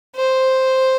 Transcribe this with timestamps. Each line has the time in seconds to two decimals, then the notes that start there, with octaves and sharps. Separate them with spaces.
0.16 C5